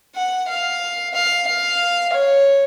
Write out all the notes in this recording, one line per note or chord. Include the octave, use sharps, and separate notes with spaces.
F#5
F5
F5
F5
C#5